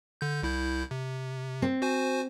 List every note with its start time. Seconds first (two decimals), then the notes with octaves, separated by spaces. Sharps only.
0.21 D3 G6
0.43 C2 E4 G6
0.91 C3
1.62 C4
1.82 F#4 C5 G#5